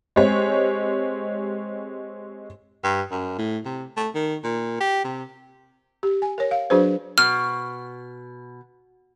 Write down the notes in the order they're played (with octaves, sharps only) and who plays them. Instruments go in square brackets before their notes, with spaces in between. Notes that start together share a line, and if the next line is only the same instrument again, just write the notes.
[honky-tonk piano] G#3 C4 G4 C#5
[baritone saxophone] G2
F#2
A2
C3
A3
D#3
A#2
G4
C3
[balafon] G4
G#5
A#4 C#5
F5
F#3 D4 F#4 G#4 B4 C5
[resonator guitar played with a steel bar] B2 [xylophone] F6